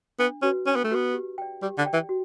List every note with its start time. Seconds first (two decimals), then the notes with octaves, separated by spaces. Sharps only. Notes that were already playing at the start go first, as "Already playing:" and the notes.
0.19 B3 D4
0.42 C#4 F#4 B4
0.67 C#4 D4
0.76 B3
0.85 A3
0.91 B3 F#4 B4
1.14 G4
1.38 D5 G5
1.62 G3 G4
1.78 D3
1.86 D5 G5
1.93 E3
2.09 F#4